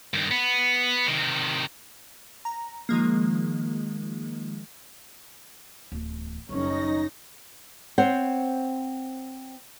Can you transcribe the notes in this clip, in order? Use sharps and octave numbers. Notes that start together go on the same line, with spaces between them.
G2 D#3
B3
C3 D#3
A#5
D#3 F3 G#3 A#3
D1 E2
F#1 D#3 G3 C#4 D#4 A#6
C4 C5 C#5 F#5